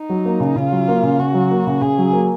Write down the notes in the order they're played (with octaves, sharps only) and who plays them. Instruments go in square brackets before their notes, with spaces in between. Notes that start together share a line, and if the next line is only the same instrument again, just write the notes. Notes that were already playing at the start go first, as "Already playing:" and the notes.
Already playing: [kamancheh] D#4
[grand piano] F#3
A#3
C#3
[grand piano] C#3 [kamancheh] F4
[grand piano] F#3
A#3
C#3
[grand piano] C#3 [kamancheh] F#4
[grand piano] F#3
A#3
C#3
[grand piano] C#3 [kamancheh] G#4
[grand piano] F#3
A#3